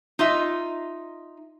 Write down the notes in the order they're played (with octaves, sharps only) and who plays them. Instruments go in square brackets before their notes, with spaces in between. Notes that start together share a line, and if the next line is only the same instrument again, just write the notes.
[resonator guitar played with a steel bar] D#4 F4 D#5 E5